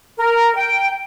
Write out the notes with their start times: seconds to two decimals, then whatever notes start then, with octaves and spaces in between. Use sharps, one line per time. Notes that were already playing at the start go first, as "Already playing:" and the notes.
0.19 A#4
0.56 G5